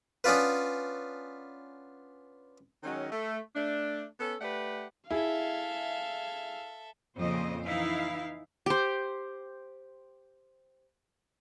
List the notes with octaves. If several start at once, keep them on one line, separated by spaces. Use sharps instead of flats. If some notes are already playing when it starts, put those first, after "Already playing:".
B3 C#4 D4 F4 B4
D#3 F#3 G#3 C#4
A3
A3 D4
B3 C#4 A4
A3 G4 B4 D5 F#5
E4 G#4 A4 E5 F5
F2 A#2 C#3 C5 D#5
E3 D#4 E4 F5
G4 C5